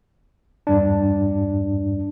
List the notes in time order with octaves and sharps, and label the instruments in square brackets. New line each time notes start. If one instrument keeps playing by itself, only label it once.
[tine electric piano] E2 G2 D4